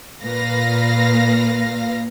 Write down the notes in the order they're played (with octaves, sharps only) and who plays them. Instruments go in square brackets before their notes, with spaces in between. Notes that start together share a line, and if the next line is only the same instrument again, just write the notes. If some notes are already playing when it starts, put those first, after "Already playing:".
[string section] A#2 B4 F5 A#6